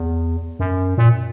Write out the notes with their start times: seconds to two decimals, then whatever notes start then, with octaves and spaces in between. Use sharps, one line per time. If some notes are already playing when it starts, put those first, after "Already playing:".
Already playing: E2
0.59 F#2
0.98 A#2